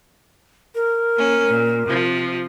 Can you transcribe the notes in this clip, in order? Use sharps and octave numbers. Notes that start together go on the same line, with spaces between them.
A#4
A#3 C#4
A#2
C3 F3